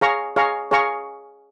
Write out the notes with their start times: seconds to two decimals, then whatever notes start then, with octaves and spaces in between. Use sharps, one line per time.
0.01 G#4 C#5 F5 A#5 C#6
0.36 G#4 C#5 F5 A#5 C#6
0.71 G#4 C#5 F5 A#5 C#6